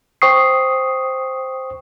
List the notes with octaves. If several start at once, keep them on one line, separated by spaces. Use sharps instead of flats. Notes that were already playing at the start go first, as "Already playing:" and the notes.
C5 G5 C#6 D#6 C7